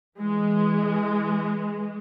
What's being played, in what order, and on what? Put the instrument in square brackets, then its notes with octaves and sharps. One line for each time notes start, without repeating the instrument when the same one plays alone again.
[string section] E3 G#3